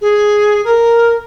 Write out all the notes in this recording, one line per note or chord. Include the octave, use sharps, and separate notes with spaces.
G#4
A#4